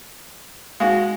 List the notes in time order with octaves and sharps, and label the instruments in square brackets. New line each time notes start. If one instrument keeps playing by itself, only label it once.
[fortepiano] G#3 F#4 [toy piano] D#4 F5